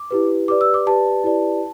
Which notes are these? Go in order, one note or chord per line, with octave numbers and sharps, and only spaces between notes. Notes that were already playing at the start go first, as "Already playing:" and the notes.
Already playing: D6
E4 G4 B4
G4 B4 D5 D6
E6
D6
G4 B4 D5 A5
E4 G4 B4 D5